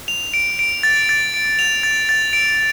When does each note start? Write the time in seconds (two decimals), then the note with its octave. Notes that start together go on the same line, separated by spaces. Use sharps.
0.08 F7
0.34 D7
0.59 D7
0.83 A6
1.09 A6
1.34 D7
1.59 F7
1.83 A6
2.09 A6
2.33 D7